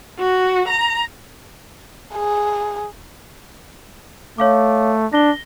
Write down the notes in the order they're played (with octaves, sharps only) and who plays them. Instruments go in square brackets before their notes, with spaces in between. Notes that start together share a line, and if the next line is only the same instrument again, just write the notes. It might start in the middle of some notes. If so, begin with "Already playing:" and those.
[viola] F#4
A#5
[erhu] G#4
[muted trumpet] A3 [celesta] C#5 F5 D6
[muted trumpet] D4 [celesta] A#6 G7